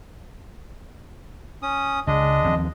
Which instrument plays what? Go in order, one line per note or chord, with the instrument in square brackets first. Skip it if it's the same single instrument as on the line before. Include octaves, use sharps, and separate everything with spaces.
[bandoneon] C#4 D#6
[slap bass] C#2 [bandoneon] G#3 D4 D#5
[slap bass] D#2 F3 C4